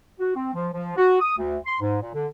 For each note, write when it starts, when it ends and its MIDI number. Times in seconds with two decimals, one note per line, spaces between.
0.20 0.31 66
0.35 0.49 60
0.54 0.67 53
0.74 0.92 53
0.97 1.19 66
1.20 1.35 87
1.37 1.58 38
1.66 1.78 84
1.81 1.97 44
2.01 2.11 46
2.14 2.26 50